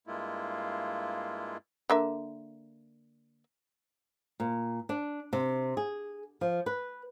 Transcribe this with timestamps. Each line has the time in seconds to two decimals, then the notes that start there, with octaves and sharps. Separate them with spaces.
0.07 G2 G#3 A#3 E4 F4
1.90 D3 A#3 E5
4.40 A#2
4.89 D4
5.33 C3
5.77 G#4
6.41 F3
6.66 B4